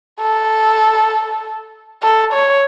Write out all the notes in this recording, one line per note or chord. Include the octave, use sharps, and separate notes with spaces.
A4
A4
C#5